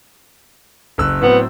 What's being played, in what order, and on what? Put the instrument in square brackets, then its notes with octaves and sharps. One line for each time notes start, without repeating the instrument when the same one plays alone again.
[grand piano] F#1 E6 F#6
[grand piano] A2 F#3 C4 [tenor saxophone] B3